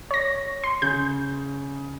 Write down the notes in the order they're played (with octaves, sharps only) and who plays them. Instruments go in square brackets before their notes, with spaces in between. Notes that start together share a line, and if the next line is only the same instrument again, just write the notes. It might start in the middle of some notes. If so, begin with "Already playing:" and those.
[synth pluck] C#5 A#6
C6
[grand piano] C#3 [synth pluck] G6